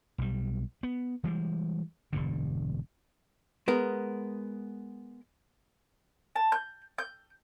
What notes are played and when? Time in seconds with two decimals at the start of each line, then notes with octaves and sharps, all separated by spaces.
0.18 B1 G3
0.83 B3
1.24 E3 G3 G#3
2.13 E1 G2 D3
3.68 G#3 B3 A#4
6.36 A5
6.52 G6
6.98 G6